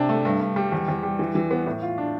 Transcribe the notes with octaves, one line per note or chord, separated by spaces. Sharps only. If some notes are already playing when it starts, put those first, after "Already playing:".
Already playing: C3 D4
A3
G2
G2
G3
E2
E2
G3
E3
E3
B3
A2
F4
D4